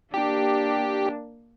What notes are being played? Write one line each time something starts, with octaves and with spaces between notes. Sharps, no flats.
A#3 D4 G4